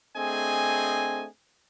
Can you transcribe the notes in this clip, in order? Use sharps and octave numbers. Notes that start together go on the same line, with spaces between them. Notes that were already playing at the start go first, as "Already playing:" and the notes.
A3 C4 D4 G#4 D#5 G#5